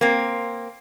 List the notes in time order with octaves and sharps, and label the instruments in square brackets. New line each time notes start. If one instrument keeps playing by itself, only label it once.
[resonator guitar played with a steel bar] A#3 C4